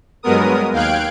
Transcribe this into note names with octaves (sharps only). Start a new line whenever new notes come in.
G2 F#3 G#3 B3 A#4 D#6
D#2 F5 G5 F#6 G#6 D7